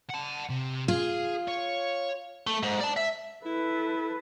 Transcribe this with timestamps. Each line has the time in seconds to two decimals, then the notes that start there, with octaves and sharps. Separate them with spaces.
0.09 F#5 A5
0.49 C3
0.88 F4 G#4
1.48 C#5
2.47 A3
2.63 G#2
2.80 D5 A5
2.96 E5
3.46 E4 A4 B4